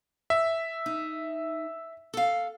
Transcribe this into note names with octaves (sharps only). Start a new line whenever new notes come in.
E5
D#4
A4 F5